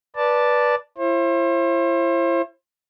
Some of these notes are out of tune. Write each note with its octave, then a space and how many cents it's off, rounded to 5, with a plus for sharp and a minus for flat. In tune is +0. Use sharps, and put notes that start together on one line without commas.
B4 -15 D5 +0 A5 +0
E4 +35 C5 +40